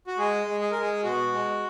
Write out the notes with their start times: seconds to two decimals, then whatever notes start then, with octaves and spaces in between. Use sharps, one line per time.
0.07 F#4
0.18 G#3 G#4
0.47 G#3
0.61 G#4
0.71 G#3 A#4
0.81 G#4
1.04 B2 F#4
1.32 G#3